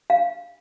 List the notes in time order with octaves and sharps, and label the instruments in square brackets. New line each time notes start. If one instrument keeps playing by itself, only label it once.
[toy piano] F5